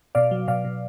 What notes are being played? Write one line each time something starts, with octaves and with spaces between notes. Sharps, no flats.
B2 D5 F5
F#3
B2 D5 F5
B2